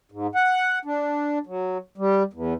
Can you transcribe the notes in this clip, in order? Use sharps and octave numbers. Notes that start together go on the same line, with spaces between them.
G#2
F#5
D4
F#3
G3
E2